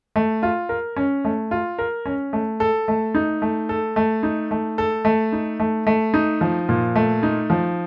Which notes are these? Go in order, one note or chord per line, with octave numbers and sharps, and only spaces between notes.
A3
F4
A#4
C#4
A3
F4
A#4
C#4
A3
A4
A3
D#4
A3
A4
A3
D#4
A3
A4
A3
D#4
A3
A3
D#4
F3
A#2
A3
D#4
F3